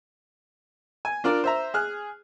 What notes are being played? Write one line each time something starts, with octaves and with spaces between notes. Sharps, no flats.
G#5
D4 F4 A#4 D5
C5 E5 A#5
G#4 F6 F#6